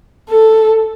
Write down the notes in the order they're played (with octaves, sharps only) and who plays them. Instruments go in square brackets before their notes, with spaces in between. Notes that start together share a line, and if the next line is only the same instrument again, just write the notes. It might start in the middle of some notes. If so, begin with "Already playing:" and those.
[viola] A4